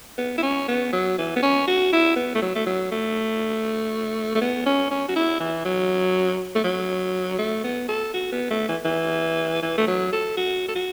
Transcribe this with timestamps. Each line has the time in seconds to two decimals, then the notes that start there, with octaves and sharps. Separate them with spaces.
0.18 B3
0.38 E4
0.43 C#4
0.68 B3
0.93 F#3
1.18 E3
1.36 B3
1.42 C#4
1.68 F#4
1.93 E4
2.16 B3
2.35 A3
2.42 F#3
2.55 A3
2.66 F#3
2.92 A3
4.35 A3
4.41 B3
4.66 C#4
4.91 C#4
5.08 F#4
5.16 E4
5.40 E3
5.65 F#3
6.55 A3
6.64 F#3
7.39 A3
7.64 B3
7.88 A4
8.14 F#4
8.32 B3
8.51 A3
8.69 E3
8.85 E3
9.63 E3
9.78 A3
9.87 F#3
10.12 A4
10.37 F#4
10.68 A4
10.75 F#4